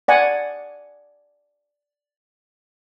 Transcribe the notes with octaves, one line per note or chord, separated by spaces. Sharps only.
D5 F#5 G#5